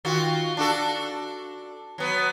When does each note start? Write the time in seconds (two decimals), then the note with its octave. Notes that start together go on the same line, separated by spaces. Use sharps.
0.05 D#3 F4 F#4
0.57 D4 F#4 A4
1.98 F#3 B3